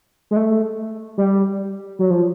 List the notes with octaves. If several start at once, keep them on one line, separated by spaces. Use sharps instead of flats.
G#3
A3
G3
F#3
F3